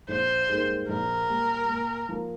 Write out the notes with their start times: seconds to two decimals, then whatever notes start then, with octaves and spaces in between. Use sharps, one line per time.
0.08 A#1 C5
0.48 G#2 G3 A#3
0.89 A#1 A#4
1.29 A#2 G3
1.69 A#2
2.09 F3 A#3